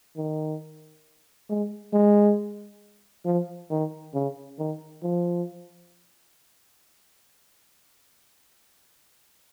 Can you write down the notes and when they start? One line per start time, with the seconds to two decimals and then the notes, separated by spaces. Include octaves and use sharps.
0.16 D#3
1.49 G#3
1.93 G#3
3.26 F3
3.71 D#3
4.14 C#3
4.59 D#3
5.03 F3